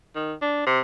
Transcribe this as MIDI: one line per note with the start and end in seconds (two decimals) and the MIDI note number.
0.15 0.33 51
0.42 0.66 62
0.66 0.80 48